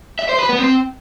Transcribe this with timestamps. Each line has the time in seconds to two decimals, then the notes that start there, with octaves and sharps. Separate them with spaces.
0.19 E5
0.29 C5
0.39 B4
0.49 B3
0.59 C4